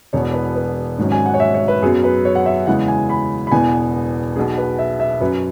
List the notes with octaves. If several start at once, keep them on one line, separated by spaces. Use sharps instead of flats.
E1 E2 B2 B3 C#5
B4
B4
G#1 G#2 F#3 C#4
G#5
F#5
C#5
E5
C#5
B4
F#2 F#3 B3 G#4
B4
C#5
F#5
E5
E2 C#3 E3 G#3 F#5
G#5
B5
B5
E1 E2 E3 B3 G#5
B1 B2 B3 G#4
B4
E5
E5
F#2 F#3 C#4 B4